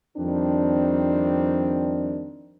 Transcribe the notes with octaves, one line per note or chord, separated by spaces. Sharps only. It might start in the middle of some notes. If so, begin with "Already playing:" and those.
F2 D#3 G3 C4 D4